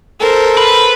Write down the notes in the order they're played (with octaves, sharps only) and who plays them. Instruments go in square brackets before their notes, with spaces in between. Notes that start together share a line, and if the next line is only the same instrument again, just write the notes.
[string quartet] A4 A#4 C5
[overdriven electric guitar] B4